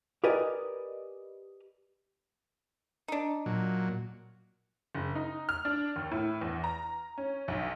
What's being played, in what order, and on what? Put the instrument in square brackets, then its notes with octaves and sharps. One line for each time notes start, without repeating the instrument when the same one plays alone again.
[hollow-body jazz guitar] G4 A#4 B4 D5 D#5 G#5
[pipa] D4 D#4
[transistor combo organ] A#2 F#3
[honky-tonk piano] F#1
D#4
F6
D4
D#2
A2
E2
A#5
C#4
B1